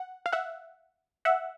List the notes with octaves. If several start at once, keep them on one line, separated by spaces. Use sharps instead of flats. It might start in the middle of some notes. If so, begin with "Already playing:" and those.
Already playing: F#5
F5
E5 F#5
E5 F#5